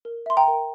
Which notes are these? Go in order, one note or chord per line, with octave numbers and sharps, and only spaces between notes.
A#4
E5 C6
G5 A#5
A#4